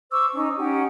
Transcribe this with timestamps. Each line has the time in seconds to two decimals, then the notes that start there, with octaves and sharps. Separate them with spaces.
0.10 C5 C#6 D6 E6
0.34 C#4 D#4
0.58 C#4 D#4 G4 F#5